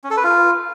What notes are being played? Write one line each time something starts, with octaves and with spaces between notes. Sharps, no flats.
C#4
A4
B4
F4